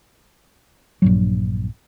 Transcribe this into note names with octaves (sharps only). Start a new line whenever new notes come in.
A#1 G2 F#3